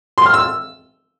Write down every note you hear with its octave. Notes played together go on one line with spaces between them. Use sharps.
C6
F6
E6